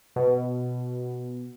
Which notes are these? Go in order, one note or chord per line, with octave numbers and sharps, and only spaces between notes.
B2